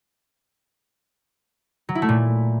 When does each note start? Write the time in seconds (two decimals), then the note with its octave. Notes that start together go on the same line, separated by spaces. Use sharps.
1.89 F#3
1.95 E4
2.02 A3
2.09 A#2